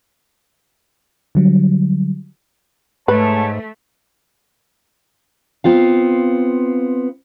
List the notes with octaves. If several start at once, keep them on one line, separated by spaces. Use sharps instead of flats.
D3 F#3 G3
G#2 G#3 A3 B4 C#5 A5
B3 C4 F4 F5